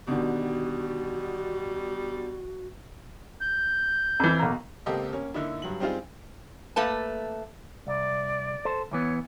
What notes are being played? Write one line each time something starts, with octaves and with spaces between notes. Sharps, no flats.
B2 D3 D#3 G3 F#4
G6
F2 E3
B1 A#3 A#5
C#2 A#3 C4 G4 A4 D#5
A#3 C#4
D3 A#3 D#4 E4
G2 F#3 F#7
G3 C4 D#4 F4 G#4
A3 A#3 B4 A5
C2 D5
A4 C5
E2 E3 B3 C#5